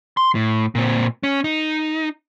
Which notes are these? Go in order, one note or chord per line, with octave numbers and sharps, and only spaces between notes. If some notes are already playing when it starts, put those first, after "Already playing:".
C6
A2
A#2 C4
C#4
D#4